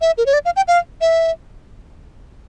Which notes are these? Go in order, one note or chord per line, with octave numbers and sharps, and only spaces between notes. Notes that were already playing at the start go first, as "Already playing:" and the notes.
E5
A#4
C#5
D5
F5
G5
F5
E5